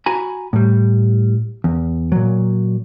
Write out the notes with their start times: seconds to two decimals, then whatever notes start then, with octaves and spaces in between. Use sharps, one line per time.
0.06 F#4 G#5 A#5 B5
0.53 A2 G3
1.64 E2
2.12 A#2 F#3